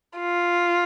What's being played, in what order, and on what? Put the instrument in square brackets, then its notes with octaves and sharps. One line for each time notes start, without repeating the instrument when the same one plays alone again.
[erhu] F4